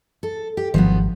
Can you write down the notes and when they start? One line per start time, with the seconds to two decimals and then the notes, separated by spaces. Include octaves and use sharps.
0.23 A4
0.57 G4
0.74 G#1 F3 F#3 B3